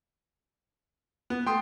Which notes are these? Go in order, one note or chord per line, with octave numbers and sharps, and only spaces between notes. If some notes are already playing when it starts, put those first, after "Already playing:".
B3
A3 G5 C6 D#6